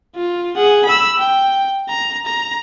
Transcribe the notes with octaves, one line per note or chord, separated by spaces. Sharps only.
F4
G#4 F#5
B5 E6
G5
A#5
A#5